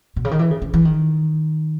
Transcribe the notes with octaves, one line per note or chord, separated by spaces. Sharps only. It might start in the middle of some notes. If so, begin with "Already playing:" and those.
B2
C#3
D#3
E3
C#3
C#3
E3
D#3